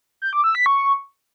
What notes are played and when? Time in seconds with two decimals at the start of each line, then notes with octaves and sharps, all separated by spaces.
0.22 G6
0.33 D6
0.44 E6
0.55 B6
0.66 C#6